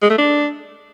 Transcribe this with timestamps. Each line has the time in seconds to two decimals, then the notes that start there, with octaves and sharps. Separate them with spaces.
0.02 G#3
0.10 A3
0.18 D4